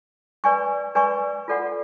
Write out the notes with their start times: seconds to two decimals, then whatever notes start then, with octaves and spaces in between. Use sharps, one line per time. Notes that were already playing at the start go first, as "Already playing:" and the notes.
0.44 B4 D5 G#5 C#6
0.95 B4 D5 G#5 C#6
1.48 F4 A4 D5 F#5